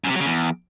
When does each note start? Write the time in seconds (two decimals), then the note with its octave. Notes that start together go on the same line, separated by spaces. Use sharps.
0.04 F#2
0.09 C3
0.15 F#3
0.20 C#3
0.25 E2